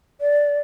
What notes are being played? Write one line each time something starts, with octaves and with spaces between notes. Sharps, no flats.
D5